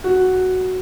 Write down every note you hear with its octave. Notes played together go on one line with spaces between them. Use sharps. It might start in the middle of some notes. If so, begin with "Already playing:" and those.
F#4